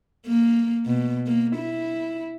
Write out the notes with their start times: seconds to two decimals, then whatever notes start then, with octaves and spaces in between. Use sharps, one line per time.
0.27 A#3
0.86 B2
1.27 A#3
1.56 E4